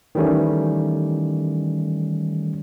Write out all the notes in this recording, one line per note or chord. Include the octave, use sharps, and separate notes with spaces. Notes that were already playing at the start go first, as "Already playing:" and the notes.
D#3 E3 G3 A3 C#4